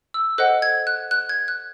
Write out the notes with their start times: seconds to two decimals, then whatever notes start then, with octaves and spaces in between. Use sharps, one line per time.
0.14 E6
0.38 A4 C5 D#5 F#5 F#6
0.62 G#6
0.87 F#6
1.11 F#6
1.29 G#6
1.48 F#6